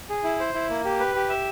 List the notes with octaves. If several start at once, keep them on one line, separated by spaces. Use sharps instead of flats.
G#4
E4
C5
E4
A#3
G4
B4
G4
E5